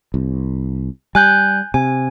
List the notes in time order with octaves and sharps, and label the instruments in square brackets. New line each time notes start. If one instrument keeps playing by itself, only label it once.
[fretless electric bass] C2
[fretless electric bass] G3 [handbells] G#5 F#6 G6
[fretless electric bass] C3 [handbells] G#5